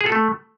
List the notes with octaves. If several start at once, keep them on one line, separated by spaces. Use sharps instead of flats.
G#4
A4
A3